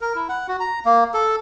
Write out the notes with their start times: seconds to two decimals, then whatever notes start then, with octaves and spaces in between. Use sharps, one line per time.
0.01 A#4
0.15 E4
0.29 F#5
0.48 F#4
0.60 A#5
0.85 A#3
1.14 A4